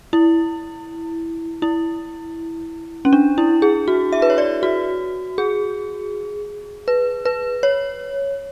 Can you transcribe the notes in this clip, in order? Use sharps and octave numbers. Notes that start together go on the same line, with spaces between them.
E4
E4
C#4
D4
E4
G#4
F#4
E5
B4
C#5
D5
F#4
G#4
B4
B4
C#5